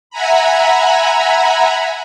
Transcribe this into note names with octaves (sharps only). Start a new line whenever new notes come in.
E5 F#5 G#5 A#5 B5